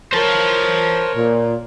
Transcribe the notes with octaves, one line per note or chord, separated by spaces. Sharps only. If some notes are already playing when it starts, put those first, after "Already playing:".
A#4 C5 C#5 A5
A#2